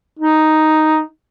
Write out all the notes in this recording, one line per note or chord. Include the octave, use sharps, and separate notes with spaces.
D#4